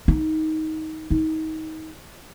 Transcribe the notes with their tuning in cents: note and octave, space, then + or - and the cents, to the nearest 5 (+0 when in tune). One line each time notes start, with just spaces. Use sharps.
D#4 +15
D#4 +25